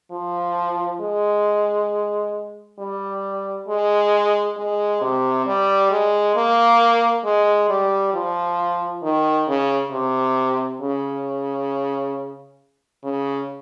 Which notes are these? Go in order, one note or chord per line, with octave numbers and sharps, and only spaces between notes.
F3
G#3
G3
G#3
G#3
C3
G3
G#3
A#3
G#3
G3
F3
D#3
C#3
C3
C#3
C#3